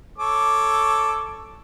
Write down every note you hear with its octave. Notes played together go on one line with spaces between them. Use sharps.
A4 C#5 D6